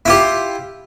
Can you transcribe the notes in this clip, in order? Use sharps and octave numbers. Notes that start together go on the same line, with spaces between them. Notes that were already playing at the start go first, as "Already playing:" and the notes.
E4 F4 G4